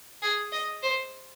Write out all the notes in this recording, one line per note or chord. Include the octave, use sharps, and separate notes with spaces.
G#4
D#5
C5